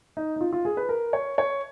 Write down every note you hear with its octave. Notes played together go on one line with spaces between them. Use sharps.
D#4
D#4
F4
F4
G#4
B4
A#4
C#5
C#5